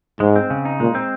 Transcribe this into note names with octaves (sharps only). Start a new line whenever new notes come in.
G#2 G#3
C4
C#3
D#4
A#2 G#3
C4